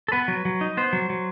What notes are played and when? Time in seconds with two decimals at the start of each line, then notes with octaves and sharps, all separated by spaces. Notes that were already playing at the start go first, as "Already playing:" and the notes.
0.08 A4
0.12 B3 B4
0.28 F#3
0.45 F#3
0.61 D#4
0.77 B3 C5
0.93 F#3
1.10 F#3